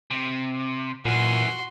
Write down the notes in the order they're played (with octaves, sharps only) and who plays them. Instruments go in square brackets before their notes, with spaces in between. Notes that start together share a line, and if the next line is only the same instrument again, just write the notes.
[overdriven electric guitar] C3
[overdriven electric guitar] F#2 E3 [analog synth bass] A#2 [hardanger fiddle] F#4 C6